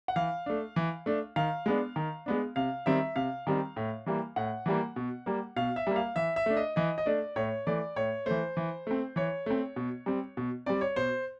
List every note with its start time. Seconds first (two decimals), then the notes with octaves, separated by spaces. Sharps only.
0.08 F#5
0.16 E3 F5
0.46 A3 D4
0.76 E3
1.06 A3 D4
1.36 D#3 F5
1.66 G#3 B3 D4
1.96 D#3
2.26 G#3 B3 D4
2.56 C3 F5
2.86 D#3 G3 C4 E5
3.16 C3 F5
3.47 D#3 G3 C4
3.76 A2
4.06 E3 G3 A#3
4.36 A2 F#5
4.66 E3 G3 A#3
4.96 B2
5.26 G3 A#3
5.56 B2 F5
5.76 E5
5.87 G3 A#3
5.96 F5
6.16 E3 E5
6.36 E5
6.46 A3 D4
6.57 D#5
6.76 E3 D#5
6.98 D#5
7.06 A3 D4 D5
7.36 A2 C#5
7.67 E3 A3 D5
7.96 A2 C#5
8.26 E3 A3 C5
8.57 E3
8.87 A3 C4
9.16 E3 C#5
9.46 A3 C4
9.76 B2
10.06 G3 C4
10.37 B2
10.66 G3 C4 D5
10.81 C#5
10.96 B2 C5